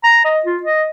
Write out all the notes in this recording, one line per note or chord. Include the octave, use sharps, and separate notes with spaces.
A#5
D#5
F4
D#5